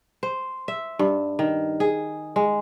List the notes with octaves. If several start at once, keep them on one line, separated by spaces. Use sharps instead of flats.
C5
E5
G2
D#3
G#4
G#3